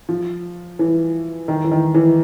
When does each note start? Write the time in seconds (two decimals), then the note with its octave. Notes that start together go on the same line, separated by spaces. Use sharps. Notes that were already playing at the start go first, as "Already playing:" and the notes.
0.09 F3
0.79 E3
1.48 D#3
1.64 E3
1.71 D#3
1.94 E3